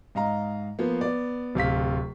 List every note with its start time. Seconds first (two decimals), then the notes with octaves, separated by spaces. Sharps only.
0.15 G#2 D#5 F5 A#5
0.79 F3 A#3 B3
1.01 B3 D5
1.55 D1 C3 F5 B6